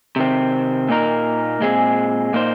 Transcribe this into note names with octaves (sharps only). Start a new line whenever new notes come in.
C3 D#3 C4
A#2 A#3 D#4 A#4
A#2 G#3 C4 G#4
A#2 A#3 D#4 C5